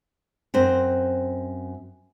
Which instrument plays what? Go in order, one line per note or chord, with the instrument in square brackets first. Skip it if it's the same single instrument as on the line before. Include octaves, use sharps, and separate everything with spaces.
[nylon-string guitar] F#2 C4 C5